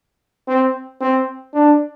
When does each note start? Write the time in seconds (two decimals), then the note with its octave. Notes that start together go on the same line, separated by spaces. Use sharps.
0.48 C4
1.01 C4
1.54 D4